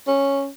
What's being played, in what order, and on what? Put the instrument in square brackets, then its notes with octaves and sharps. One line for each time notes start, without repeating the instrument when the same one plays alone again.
[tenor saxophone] C#4